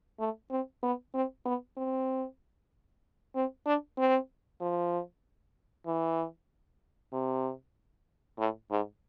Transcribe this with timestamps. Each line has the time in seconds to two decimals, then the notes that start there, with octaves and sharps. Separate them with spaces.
0.20 A3
0.50 C4
0.83 B3
1.14 C4
1.46 B3
1.77 C4
3.35 C4
3.66 D4
3.97 C4
4.61 F3
5.87 E3
7.13 C3
8.38 A2
8.71 G#2